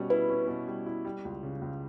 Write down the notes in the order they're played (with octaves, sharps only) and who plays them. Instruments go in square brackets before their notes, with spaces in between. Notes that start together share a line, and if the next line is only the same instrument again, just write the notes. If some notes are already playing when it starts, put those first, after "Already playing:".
Already playing: [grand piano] B2 G3 C#4
[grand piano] E4 [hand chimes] B4
[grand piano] C#4
B2
G3
E4
G3
C#2
C#3
C#2